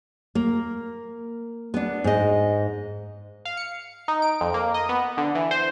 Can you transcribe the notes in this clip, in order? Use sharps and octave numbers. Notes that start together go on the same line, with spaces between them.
A#3
B3 D4
G#2 D#5
F5
C#7
D#4
D7
F2
A#3
D#5
B3
D3
E3
C5